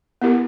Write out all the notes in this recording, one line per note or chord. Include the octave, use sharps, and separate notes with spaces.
B3 E4 G4 A#4